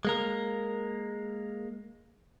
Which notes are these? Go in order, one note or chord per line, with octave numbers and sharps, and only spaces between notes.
G#3 A#3 A#4